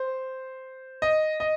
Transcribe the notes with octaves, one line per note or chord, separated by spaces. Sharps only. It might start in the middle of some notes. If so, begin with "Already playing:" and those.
Already playing: C5
D#5
D#5